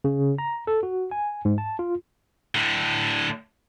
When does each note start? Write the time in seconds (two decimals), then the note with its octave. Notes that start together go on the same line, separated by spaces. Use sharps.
0.04 C#3
0.38 A#5
0.67 A4
0.83 F#4
1.11 G#5
1.45 G#2
1.58 A5
1.79 F4
2.55 A2 D3